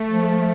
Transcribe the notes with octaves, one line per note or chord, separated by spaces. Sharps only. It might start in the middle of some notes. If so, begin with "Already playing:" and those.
Already playing: A3
F3